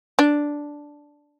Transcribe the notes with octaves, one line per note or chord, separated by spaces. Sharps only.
D4